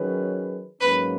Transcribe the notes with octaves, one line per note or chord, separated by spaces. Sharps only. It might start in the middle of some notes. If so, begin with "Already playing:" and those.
Already playing: D#3 F#3 C#4 G#4 B4
G#2 F#3 A#3 C#4 B4